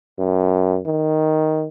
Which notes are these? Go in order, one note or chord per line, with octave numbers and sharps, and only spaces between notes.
F#2
D#3